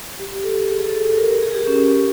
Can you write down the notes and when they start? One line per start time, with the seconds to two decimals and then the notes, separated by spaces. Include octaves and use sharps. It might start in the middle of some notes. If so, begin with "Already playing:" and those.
0.20 G4
0.44 A4
0.69 G#4
0.86 A4
1.02 A4
1.17 A#4
1.43 G#4
1.55 G4
1.67 C#4